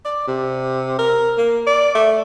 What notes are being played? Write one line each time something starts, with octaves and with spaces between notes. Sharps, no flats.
D5
C3
A#4
A#3
D5
A3